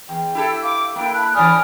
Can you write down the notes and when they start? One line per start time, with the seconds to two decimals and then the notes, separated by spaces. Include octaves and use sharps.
0.09 E2 G5
0.35 E4 G4 A4
0.63 F5 D6
0.96 A#3 E4 G5
1.14 A5 B5 F#6
1.34 A2 D3 E3 D5 G#5 B5 D#6 F6